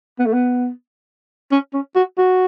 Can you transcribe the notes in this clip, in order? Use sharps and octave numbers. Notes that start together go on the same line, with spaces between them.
B3
A3
B3
C#4
C#4
F#4
F#4